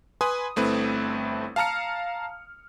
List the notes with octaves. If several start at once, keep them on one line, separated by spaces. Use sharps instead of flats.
B4 G#5 B5 C6 D#6
G1 A3 C4 E4 B4
F5 A5 A#5 F6 C#7